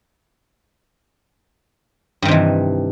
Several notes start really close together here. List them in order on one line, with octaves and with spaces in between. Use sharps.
G2 D#3 C3 E3